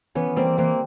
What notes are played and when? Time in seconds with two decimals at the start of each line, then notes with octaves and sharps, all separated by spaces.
0.15 E3 B3 C#4
0.36 G3 A#3 C4
0.58 E3 A#3 C4